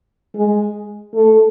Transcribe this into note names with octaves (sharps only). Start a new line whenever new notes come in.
G#3
A3